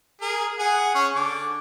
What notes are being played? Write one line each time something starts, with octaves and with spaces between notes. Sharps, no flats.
G#4 A#4
G#4 F#5 G#5
C#4 C#5
D3 D6